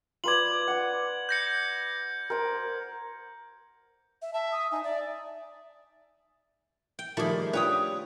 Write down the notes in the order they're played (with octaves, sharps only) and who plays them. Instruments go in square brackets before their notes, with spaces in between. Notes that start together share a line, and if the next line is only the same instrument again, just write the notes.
[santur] F4 B4 D5 [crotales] G#6 F#7
[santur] F#5 D6
[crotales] G6 A#6 C#7
[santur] A#4 C5 A#5
[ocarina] E5
[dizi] E5 [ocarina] A5
[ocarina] D#6
[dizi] D#4 [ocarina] G#5
[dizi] D5 [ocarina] E5
[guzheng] G5
[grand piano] D#3 F3 G3 [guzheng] A3 G#4 [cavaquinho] B5 D6
[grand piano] D4 F4 G4 [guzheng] B4 [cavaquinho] C#5 G5 D#6